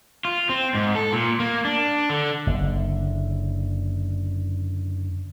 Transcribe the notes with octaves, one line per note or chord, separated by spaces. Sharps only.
F4
C4
G#2
A4
A#2
A#3
D4
D3
F#1 D3